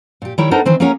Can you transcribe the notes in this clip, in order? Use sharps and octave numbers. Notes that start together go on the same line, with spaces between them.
A#2 G4
D#3 G3 E4 C#5 G5
B3 D4 D#4 A4 A#4 C5
D#3 E3 C4 G#4 C5
A#3 C#4 G#4 A#4 C#5 F#5